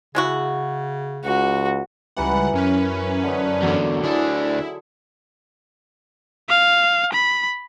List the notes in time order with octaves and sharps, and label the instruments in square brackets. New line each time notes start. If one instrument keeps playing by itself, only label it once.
[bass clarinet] C#3 [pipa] G#3 E4 F#4
[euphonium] C#2 [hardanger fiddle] F#4
[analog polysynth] C#2 G3 F#5 [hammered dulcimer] E3 A#5 B5
[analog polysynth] F#2 C#4 B4 [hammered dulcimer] A#4
[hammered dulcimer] D3 D#4
[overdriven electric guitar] E2 D3 [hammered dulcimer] F#3
[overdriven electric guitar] D2 D4 [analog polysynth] E4 [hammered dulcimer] G#4 A4
[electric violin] F5
B5